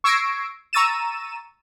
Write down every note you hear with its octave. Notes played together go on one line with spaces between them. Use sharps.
C#6 E6 G#6 A#6 C7 D7
A#5 C#6 E6 A6 D#7 E7